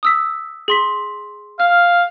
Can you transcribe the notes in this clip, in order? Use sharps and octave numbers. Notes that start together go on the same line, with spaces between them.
D#6 E6 B6
G#4 C6 B6
F5 F6